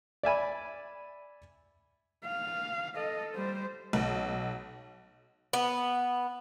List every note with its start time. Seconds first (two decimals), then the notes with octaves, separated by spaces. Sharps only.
0.23 D5 E5 G#5 B5
2.25 F5
2.96 A4 D#5
3.35 G3 C5
3.93 B1
5.53 B3